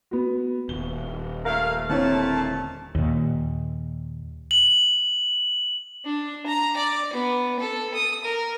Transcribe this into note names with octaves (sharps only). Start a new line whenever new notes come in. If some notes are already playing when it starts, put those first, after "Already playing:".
B3 F#4
D#1 G7
A#2 A3 A#4 E5 F5
A#2 D3 A3 C4 E4 C#5 A5
D#2 A#2
F#7
D4
A#5
D5
B3
A4
D#6
A#4